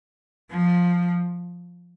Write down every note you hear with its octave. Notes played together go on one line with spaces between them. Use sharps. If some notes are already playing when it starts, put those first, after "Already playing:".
F3